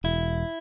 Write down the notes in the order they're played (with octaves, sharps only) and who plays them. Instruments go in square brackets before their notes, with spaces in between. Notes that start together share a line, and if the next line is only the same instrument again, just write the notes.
[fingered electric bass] E1 [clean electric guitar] E4